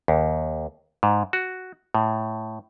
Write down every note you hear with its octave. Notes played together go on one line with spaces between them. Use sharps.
D#2
G#2
F#4
A2